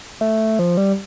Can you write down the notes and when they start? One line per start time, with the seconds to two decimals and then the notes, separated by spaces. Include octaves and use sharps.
0.21 A3
0.59 F3
0.77 G3